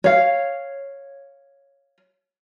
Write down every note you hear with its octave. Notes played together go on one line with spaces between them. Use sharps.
C#5 F5